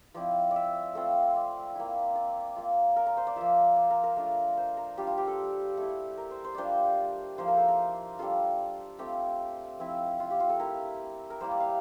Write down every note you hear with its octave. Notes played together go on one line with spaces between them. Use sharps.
F3 C4 E4 D5
D5
E5
A3 C4 F4
D5
A#3 E4
D5
A#3 F4
A#4
A#4
C5
D5
F3 A#3 F4 E5
D5
A#4
A#4
A3 D4 F4
C5
A#4
G3 D4 F4 G4
F4
G4
A4
A3 E4
A#4
C5
C5
G3 D4 F4 C5 D5
F3 A#3 E4 C5
A#4
A4
A#4
G3 D4 F4 A4
A3 C4 F4 G4
F3 C4 E4
F4
G4
F4
A4
A3 E4 A#4
A#4
G3 A#3 E4 C5
D5
F5